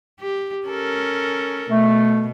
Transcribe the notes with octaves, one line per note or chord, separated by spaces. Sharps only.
G4
C#4 A4 A#4
B2 A3